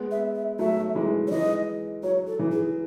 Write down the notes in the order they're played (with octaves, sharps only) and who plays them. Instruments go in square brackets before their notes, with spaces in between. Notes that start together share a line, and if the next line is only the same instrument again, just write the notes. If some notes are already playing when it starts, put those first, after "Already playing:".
Already playing: [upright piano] G#3 B3
[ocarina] E5
E5
[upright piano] F#3 A3 [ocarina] E5
[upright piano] E3 G#3
[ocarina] C#5
[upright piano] E3 G#3 [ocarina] D#5
[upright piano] F#3 [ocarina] C#5
[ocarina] A4
[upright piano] E3
[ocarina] G#4